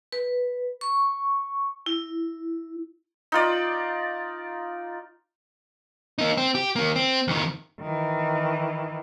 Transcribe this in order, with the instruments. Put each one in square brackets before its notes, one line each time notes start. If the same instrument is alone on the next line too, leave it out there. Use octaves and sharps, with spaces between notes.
[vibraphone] B4
C#6
E4
[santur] D#4 F4 D5
[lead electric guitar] A#3 D#4
C4
G4
D#3 A#3
C4
F2 D#3
[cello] D#3 E3